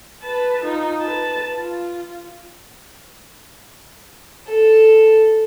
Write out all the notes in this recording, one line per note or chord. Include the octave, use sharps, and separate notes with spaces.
B4 A5
D#4 F4
B4 A5
F4
A4